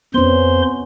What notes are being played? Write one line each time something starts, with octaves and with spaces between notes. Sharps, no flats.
F2 B3 C#4 C5 C6